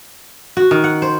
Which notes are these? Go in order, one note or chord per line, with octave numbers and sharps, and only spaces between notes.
F#4
D#3
F#5
C5